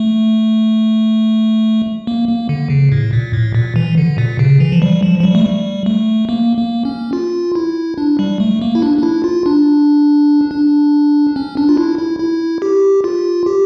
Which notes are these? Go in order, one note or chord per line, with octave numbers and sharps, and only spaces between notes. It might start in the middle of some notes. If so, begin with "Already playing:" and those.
Already playing: A3
A#3
A#3
D3
C#3
A2
A#2
A2
A#2
E3
D3
A#2
C#3
E3
F3
G3
F3
F3
G3
A3
G3
A3
A#3
A#3
C#4
F4
E4
D4
G3
A3
A#3
E4
D4
D4
E4
F4
D4
D4
C#4
D4
F4
E4
E4
E4
G4
F4
G4